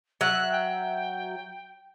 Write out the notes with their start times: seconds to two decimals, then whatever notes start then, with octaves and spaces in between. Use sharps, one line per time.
0.21 F#3 E5 F#6
0.52 G5